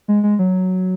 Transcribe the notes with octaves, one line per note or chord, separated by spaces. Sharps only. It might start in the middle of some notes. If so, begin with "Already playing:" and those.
G#3
G#3
F#3